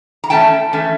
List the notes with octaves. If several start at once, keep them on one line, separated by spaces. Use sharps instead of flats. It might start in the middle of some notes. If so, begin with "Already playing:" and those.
A#5
E3 A3 C#4 G5 A5
E3 A3 C#4